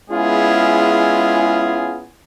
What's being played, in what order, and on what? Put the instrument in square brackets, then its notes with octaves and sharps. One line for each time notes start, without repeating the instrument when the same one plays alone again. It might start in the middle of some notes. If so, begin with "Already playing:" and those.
[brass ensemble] G#3 B3 C#4 E4 F4 G#4